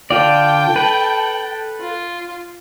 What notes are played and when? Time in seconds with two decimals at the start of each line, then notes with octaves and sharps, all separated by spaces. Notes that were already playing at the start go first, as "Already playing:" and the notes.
0.11 D3 F4 D5 G5 A5
0.76 A4 B4
1.80 F4